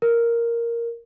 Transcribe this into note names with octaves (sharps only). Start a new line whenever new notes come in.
A#4